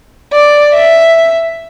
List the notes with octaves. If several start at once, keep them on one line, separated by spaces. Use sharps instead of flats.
D5
E5